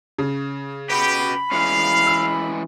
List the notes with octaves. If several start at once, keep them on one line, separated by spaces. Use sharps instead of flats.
C#3
F#4 G4 B4 B5
E3 G#3 C#4 F5
E6